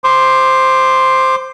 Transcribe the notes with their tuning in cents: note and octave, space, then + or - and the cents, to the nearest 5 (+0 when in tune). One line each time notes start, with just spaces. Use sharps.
C5 +0 D6 +20